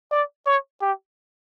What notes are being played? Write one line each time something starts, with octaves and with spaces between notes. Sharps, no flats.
D5
C#5
G4